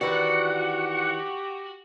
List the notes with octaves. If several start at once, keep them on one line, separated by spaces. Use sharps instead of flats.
D#3 E3 F#4 G4 D5 F#5